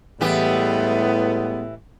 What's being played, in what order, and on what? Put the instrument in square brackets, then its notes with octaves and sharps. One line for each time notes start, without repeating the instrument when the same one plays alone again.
[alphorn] A2 [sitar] E3 G4 [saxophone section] G3 G#3 B3